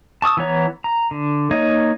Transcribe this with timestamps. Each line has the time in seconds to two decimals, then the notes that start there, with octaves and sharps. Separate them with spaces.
0.22 A5 C#6 D#6 E6
0.37 E3 B3 C#5 A#5
0.84 A#5
1.11 D3
1.51 A#3 D#4 C#5 D#5